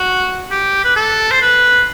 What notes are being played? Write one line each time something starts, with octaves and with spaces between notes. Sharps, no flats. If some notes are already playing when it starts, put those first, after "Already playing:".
Already playing: F#4
G4
B4
A4
C5
B4